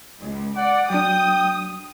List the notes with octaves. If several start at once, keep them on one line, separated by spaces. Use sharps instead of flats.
C#2
D5 F#5
F#3 D4 G5 D#6